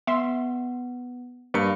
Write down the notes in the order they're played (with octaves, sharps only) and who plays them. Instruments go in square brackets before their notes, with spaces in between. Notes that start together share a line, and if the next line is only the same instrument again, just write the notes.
[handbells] B3 [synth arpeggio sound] E5 C6
[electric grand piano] G2 C#7 [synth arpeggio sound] A#3